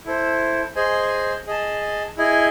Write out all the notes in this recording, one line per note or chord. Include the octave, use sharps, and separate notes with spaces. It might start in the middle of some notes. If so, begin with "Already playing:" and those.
E4 A4 C5
G#4 C5 D#5 G#5
G#4 D#5 A5
E4 G#4 D#5 G#5